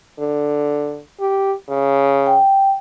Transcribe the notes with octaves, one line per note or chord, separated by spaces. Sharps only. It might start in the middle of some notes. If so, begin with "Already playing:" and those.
D3
G4
C#3
G5